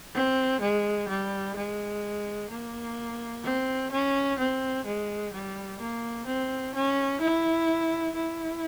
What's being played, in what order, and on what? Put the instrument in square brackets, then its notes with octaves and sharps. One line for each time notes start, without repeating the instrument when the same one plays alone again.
[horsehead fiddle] C4
G#3
G3
G#3
A#3
C4
C#4
C4
G#3
G3
A#3
C4
C#4
E4
E4